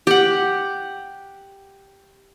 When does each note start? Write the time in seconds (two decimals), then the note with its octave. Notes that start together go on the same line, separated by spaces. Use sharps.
0.07 G4 F#5